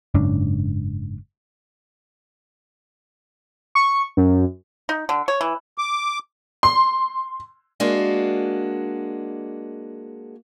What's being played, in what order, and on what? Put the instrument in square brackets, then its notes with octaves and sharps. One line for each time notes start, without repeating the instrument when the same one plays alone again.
[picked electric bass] F#1 G#2 C#4 D4
[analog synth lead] C#6
F#2
[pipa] D#4
D3
C#5
E3
[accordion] D6
[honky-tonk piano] C6
[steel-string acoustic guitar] G#3 A#3 D4 F#4